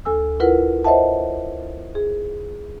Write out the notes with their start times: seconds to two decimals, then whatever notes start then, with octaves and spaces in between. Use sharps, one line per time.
0.05 D2 A4 G#5 E6
0.40 E4 F4 A#4 B4 F#5
0.84 C5 C#5 D#5 E5 F#5 A5
1.95 G#4